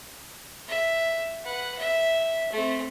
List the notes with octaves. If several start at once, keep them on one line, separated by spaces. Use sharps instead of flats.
E5
B4 F#5
E5
A3 C4